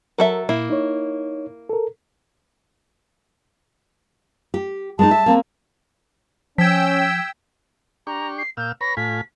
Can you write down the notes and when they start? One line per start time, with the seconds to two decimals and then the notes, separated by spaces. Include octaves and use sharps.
0.18 F#3 A4 A#4 E5
0.49 A#2 A#3 E4
0.70 D#4 C#5
1.69 A4 A#4
4.54 G4
4.99 G#3 B3 D#4 A5
5.11 E5
5.26 A#3 C4 C#4
6.58 F3 C#4 G5 E6 G#6 B6
8.07 D4 G4 A#5 C#6
8.38 C7
8.57 A#2 F5 E6 G6
8.81 B4 C#5 B5 A#6
8.97 A2 F4 G#5 B6